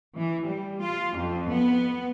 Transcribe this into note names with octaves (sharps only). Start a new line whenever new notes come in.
E3
G3
F4
F2
B3